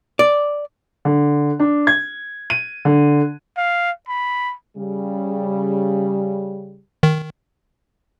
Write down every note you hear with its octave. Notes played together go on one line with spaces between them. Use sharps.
D5
D3
D4
G#6
D#7
D3
F5
B5
C#3 G3
D#3